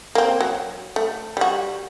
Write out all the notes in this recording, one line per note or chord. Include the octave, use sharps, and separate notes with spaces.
A#3 C4
F#3
A3
G3 F#4